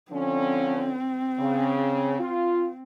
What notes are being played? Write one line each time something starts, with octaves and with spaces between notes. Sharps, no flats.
D3 F3 C4 C#4
C#3
F4